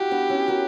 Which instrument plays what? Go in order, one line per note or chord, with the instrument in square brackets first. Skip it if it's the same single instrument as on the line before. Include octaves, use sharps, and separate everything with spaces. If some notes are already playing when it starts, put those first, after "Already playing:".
Already playing: [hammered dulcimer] E4 F#4 [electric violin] G4
[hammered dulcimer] B3 D4
C#4 E4
F#4 A#4